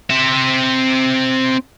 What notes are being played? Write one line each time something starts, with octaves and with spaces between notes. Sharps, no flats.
C4 E5